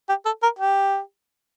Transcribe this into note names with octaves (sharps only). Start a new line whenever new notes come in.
G4
A4
A#4
G4